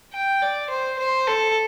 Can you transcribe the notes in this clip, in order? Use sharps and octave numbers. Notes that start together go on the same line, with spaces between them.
G5
D5
C5
C5
A4